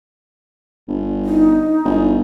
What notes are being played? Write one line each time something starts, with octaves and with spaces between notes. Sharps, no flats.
G1
D#4
G1